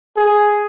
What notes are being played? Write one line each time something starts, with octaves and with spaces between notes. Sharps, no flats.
G#4